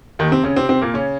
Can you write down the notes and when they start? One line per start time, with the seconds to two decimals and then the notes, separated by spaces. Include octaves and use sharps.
0.19 D#2 D#3
0.31 C3 C4
0.44 C#3 C#4
0.56 C3 C4
0.69 C3 C4
0.81 A#2 A#3
0.94 C#3 C#4